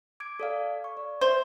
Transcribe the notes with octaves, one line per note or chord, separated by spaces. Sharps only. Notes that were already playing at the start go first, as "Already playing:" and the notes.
D6 G#6 D7
A4 D5 F5
C#6
D5
C5 E5